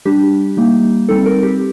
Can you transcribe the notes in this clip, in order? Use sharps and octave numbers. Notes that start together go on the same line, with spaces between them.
G3 D4 G4
G3 A#3 D#4
G3 C4 D#4 A4
A#4
G4